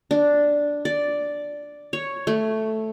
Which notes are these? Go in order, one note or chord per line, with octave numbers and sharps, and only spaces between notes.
D4
D5
C#5
A3